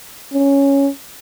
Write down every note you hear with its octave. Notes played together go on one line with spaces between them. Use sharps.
C#4